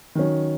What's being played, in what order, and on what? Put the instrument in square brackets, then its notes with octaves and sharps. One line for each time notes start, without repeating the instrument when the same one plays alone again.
[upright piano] D#3 F#3 C#4